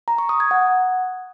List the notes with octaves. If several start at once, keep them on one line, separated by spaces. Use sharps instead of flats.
A#5
C#6
D#6
G#6
F#5